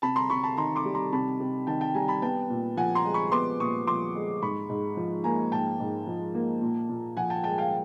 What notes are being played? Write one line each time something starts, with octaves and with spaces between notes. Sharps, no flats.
C3 A5 B5
A#5 C6
C3 B5 C#6
A5 B5
D#3 A#5 C6
C6 D6
G3
A#5 C6
C3 A5 B5
C3
D#3 G5 A5
G5 A5
G3 G#5 A#5
A5 B5
B3 G5 A5
A#2
F3 F#5 G#5
A#5 C6
G#3
B5 C#6
B3 C6 D6
A#2 C#6 D#6
F3 C6 D6
G#3
G#2 B5 C#6
G#2
F3
A#3 G#5 A#5
G#2 G5 A5
G#2
F3
A#3
A#2
A#2
F3 F#5 G#5
G5 A5
G#3 G5 A5
F5 G5